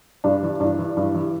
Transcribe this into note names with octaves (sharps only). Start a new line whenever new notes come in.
G2 D4
E3
G2 D4
E3
G2
E3